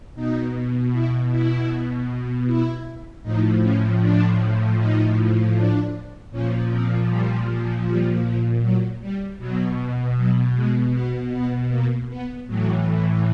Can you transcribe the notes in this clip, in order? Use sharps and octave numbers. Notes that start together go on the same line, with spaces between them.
B2 D#4
E4
E4
E4
A2 F3 D#4
C#4
D4
D#4
D4
A#2 F3 C#4
C4
G3
G3
F3
F#3
G3
B2 F#3
F#3
G#3
B3
B3
A#3
B3
A2 E3 F#3